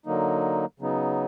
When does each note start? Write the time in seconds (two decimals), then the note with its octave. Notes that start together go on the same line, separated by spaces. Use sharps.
0.06 D3 F#3 A#3 D#4
0.80 C#3 F#3 B3 D#4